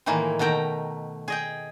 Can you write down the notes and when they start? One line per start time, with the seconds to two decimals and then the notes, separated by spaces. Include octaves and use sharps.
0.06 A2 D#3 E3 G#3 A#3
0.39 B2 D#3 A3 G5 A#5
1.28 G#4 D#5 G5